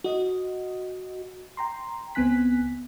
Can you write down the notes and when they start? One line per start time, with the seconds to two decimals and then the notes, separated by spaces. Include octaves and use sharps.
0.04 F#4 D#5
1.57 G5 A#5 C6
2.15 C#2 B3 C4 G#5 F#6 B6